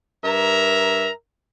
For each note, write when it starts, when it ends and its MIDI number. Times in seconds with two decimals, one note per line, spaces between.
0.24 1.10 43
0.24 1.10 70
0.24 1.10 76
0.24 1.10 82